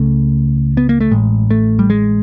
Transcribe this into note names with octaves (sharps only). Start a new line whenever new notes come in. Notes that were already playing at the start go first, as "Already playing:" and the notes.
Already playing: C#2 C#3 A3
B3
A#3
A3
A1 A2 G#3
A3
G3
G#3